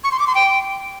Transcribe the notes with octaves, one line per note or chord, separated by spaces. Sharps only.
C#6
C6
D6
C6
G5